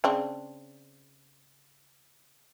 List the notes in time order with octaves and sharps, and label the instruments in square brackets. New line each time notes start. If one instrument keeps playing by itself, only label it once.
[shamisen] C#3 C4 D4